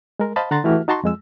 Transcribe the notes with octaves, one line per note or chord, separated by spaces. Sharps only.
G#3 A#4
C5 D#5 F5 A5 B5
D3 F#5 A#5 C6 A6
E3 A3 E4 F#4 G4 F6
D#4 F#4 A5 A#5 C6 C#6
F2 G#3 E6